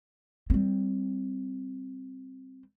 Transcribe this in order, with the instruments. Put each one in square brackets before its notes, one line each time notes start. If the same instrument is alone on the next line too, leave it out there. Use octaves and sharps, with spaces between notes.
[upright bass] G3 C4